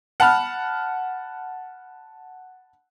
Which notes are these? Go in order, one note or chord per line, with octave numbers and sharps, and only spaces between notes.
F#5 A5 B5 F6